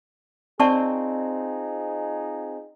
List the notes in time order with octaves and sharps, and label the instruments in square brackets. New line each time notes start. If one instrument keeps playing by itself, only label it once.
[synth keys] C4 [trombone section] D#4 F4 G#4 [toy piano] D5 A5 C#6